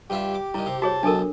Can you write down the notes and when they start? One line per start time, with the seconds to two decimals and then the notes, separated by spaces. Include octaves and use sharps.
0.10 G2 F4 G4 E5
0.34 D6
0.54 G2 D#3 E4
0.66 C3
0.82 F#4 G#4 C#5 A5
1.03 B1 D#3 D4 A4 A#4